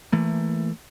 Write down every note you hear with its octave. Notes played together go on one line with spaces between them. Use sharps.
E3 A3 A#3